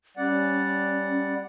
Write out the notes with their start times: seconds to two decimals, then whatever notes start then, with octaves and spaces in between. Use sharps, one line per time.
0.17 G3 C#4 D5 F#5